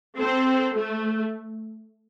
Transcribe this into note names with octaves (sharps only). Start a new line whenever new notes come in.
C4 A4 C5
A3